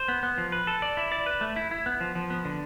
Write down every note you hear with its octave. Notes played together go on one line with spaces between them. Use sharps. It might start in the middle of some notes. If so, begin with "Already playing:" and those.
Already playing: C5
B3
B3
F3
B4
A4
D5
E4
D5
B4
A3
E4
E4
B3
F3
F3
B3
D3